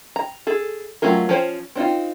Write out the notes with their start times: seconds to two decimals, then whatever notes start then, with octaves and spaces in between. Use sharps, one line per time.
0.16 A#5
0.47 G#4 A4
1.02 F#3 A3 C#4 F4 A#4
1.29 F3 C#4 C5 C#5
1.75 C4 D4 D#4 F4